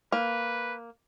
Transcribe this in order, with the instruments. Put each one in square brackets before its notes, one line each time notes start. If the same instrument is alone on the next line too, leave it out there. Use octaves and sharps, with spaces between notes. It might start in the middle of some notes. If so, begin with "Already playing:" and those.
[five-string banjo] A#3 [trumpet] B4